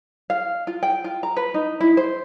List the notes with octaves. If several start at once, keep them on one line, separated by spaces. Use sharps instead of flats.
F5
F4
G5
F4
A#5
B4
D#4
E4
C5